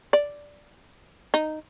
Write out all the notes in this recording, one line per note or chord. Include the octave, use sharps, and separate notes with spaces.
D5
D#4